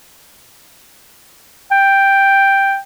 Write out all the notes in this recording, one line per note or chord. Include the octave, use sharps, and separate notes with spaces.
G5